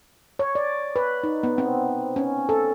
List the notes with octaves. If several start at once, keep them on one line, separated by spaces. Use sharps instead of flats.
C#5
D5
B4
D#4
B3
C4
C#4
A4